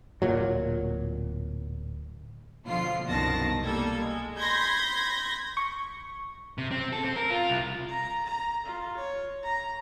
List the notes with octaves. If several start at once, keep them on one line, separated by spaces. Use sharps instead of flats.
D1 A#2 F#3
B2 D3 F3 F4 C7
C2 F#2 B2 D#3 A5 A#6
G3 A#3 A4 G#6
G#3
B5 C6 G6 G#6 A#6 B6
C#6
C3
C4
A4
C4
A#4
F4
C2
A#5
A#5
F4
C#5
A#5